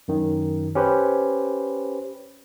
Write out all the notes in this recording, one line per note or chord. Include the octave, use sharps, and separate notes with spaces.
F#2 D#3
C#4 G4 B4 C5